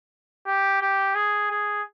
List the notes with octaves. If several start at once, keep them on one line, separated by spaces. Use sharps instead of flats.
G4
G4
G#4
G#4